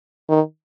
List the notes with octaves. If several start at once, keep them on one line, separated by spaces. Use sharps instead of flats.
D#3